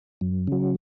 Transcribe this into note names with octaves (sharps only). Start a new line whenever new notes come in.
F#2
C#3 F#3